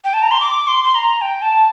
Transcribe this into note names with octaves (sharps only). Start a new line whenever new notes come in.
G5
A5
A#5
C6
D6
C6
C6
A#5
G5
A5